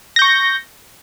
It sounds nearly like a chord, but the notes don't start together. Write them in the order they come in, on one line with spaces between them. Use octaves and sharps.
A#6 G6 C#6